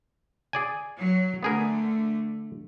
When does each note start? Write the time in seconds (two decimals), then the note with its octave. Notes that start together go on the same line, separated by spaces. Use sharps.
0.53 G#4 D5 G#5
0.99 F#3
1.43 D3 A3 B3 G#4 A#4